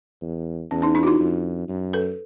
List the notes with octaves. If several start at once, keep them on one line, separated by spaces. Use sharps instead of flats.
E2
E2 C#4
C#4 D#4
D4 E4
F#4
D#4 F4
F2
F#2
A4 B4